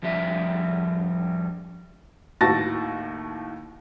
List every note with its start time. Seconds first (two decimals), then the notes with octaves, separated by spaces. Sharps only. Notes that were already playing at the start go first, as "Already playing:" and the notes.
0.03 F2 F3 G3 E5
2.41 D#2 A2 F#4 A5 A6 A#6